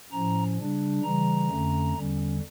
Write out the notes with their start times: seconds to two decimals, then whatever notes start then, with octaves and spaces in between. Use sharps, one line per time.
0.12 A2 F3 C#4 A#5
0.58 C#3 G3 D4
1.03 C#3 E3 G3 A#5
1.49 F2 D3 A3 C#4
1.95 E2 D3 G3 C#4